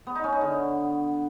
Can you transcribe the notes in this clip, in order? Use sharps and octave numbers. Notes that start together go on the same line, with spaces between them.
B3
D#4
C#4
D#4
D3